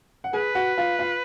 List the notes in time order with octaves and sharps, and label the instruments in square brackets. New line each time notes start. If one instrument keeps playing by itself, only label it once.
[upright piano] F#5
[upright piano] G#4 G#5 [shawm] B4
[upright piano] F#4 F#5
F4 F5
F4 F5